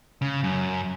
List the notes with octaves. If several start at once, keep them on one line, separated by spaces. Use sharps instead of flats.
C#3
F#2